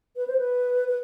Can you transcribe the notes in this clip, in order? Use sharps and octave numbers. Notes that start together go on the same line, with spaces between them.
B4
C5
B4
B4